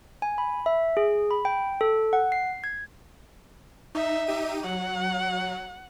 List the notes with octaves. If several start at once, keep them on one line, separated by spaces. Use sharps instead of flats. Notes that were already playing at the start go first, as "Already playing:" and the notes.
G#5
B5
E5
G#4
B5
G5
A4
F#5
C7
G#6
D#4 E5
D#4 G4 D#7
F#3 F#5